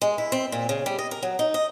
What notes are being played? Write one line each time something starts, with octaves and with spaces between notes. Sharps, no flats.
G#3
E4
C4
A#2
C#3
G3
D#5
A#4
F#3
D#4
D#5